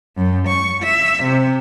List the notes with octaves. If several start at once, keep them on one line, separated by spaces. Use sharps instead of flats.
F#2
C#6
E5
C3